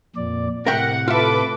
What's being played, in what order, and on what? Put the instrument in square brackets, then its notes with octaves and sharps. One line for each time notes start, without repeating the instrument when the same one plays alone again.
[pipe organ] F2 A#2 D5
[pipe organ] A2 C3 [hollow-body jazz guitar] A#4 E5 G5 [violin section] F#5
[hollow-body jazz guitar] F4 E5 [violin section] A4 B4 D6